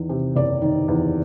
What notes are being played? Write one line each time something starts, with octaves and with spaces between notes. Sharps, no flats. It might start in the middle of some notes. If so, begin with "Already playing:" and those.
Already playing: E2 D#3
C3
F#1 D5
D#3
E2